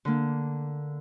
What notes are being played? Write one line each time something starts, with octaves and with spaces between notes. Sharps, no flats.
D3 A#3